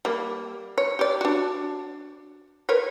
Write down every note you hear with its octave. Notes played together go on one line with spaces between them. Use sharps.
G3 A#3
C#5
G4 D5
D4 F#4
A#4 B4 C#5